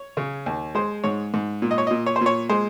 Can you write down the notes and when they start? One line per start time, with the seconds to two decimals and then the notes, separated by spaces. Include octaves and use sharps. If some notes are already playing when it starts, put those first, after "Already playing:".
Already playing: C#5
0.17 C#3
0.46 D#2
0.75 G#3 C5
1.04 G#2 C#5
1.34 G#2
1.62 A#2
1.71 D#5
1.78 C#5
1.87 A#2 D#5
2.06 C#5
2.16 C5
2.21 A#2 C#5
2.49 G#3 C5